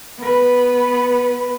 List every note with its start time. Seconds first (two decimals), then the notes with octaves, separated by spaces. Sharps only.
0.19 B3 B4